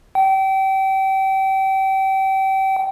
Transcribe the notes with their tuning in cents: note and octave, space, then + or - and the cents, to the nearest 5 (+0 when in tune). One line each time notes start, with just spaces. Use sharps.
G5 -30